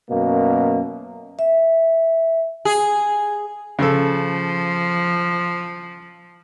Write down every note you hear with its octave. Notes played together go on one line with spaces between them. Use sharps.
F#2 B2 A#3
E5
G#4
C#3 F3 A4